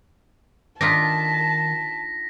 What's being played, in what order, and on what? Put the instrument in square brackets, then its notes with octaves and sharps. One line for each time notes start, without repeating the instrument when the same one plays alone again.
[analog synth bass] D#3 [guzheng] D4 D#4 F4 [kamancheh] A5 [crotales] A#6 B6